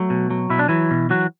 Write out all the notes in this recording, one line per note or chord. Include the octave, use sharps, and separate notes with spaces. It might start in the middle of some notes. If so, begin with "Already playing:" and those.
Already playing: F#3 A3
B2
F#3
B2 E4
D4
E3 F#3 E4
B2
E3 F#3 F#4